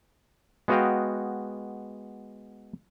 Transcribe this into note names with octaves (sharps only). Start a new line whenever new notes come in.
G#3 B3 F#4 D#5 F5 G5